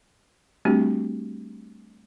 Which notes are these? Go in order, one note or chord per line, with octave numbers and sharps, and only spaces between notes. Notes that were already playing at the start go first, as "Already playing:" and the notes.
G3 A3 C4 D4 F#4 G4